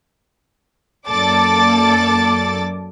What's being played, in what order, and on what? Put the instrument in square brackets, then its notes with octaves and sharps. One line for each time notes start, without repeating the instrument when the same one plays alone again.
[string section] F#2 A#3 A4 D5 D6 A6